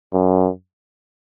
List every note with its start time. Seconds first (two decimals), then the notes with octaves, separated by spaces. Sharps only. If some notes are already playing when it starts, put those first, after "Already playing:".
0.13 F#2